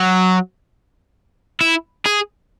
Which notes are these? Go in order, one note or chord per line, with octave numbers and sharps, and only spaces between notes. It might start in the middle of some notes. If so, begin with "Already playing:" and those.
Already playing: F#3
E4
G#4